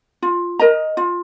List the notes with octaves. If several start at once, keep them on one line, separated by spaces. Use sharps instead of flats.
F4
A#4 D#5 A#5
F4